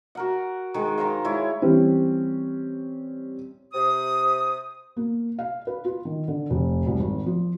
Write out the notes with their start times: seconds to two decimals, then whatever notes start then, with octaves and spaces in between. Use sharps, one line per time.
0.15 F#4 A#4 F#5
0.74 D#3 G#3 D#4
0.98 D#3 A#4 C5 F5
1.24 G#3 E4 F4 C#5
1.62 E3 G3 C4 C#4
3.73 C3 D#6
4.97 A#3
5.39 F5
5.67 B4
5.85 F4
6.05 D#3
6.28 D3
6.50 F1
6.86 C2
7.00 G#1
7.26 F3